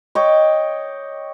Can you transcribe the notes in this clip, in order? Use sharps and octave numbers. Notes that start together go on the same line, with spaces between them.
C#5 D#5 G5 D6